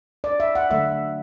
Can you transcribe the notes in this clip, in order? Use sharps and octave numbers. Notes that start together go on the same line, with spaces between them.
D5
E5
F#5
D3 F#3 A3 E5